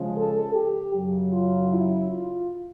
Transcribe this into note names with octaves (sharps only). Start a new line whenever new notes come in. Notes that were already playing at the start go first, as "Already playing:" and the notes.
Already playing: C#3 F3 G#3
A4
G4
F#2 C#3 F#3
F4
E4
F4